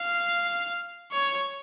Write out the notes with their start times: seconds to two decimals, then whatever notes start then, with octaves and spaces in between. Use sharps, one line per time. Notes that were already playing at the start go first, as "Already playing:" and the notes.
Already playing: F5
1.12 C#5